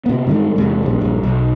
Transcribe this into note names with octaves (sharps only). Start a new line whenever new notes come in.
C3 B3
G2 D#3 G#3
E2 C3 G#3
A#1 G2
A#1 G2
B1